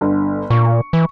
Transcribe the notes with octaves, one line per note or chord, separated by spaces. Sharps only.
G1 D3
A#2 C#6
E3